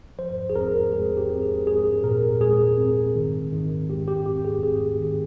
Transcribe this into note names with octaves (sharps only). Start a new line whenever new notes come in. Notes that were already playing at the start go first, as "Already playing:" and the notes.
F3 C5
G#4
C4 A#4
G#3 G#4
G4
C4
G#4
G#3 G#4
A#2 A#4
G#3 G#4
C4
D#3
D#3
G#3 G4
G4
C4 G4
G#4
C4 G#4
D#3